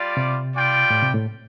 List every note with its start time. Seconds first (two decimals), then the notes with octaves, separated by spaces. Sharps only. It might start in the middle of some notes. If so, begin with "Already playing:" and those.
Already playing: G3 F4 D5
0.17 C3
0.54 G3 F4 D5 G5
0.90 A2
1.03 C3
1.15 A2